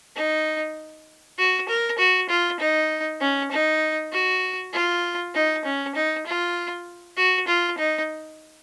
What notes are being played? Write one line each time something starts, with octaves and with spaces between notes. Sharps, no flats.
D#4
F#4
A#4
F#4
F4
D#4
C#4
D#4
F#4
F4
D#4
C#4
D#4
F4
F#4
F4
D#4